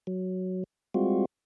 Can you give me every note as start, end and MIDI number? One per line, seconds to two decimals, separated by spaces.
0.07 0.64 54
0.94 1.25 55
0.94 1.25 56
0.94 1.25 60
0.94 1.25 65
0.94 1.25 66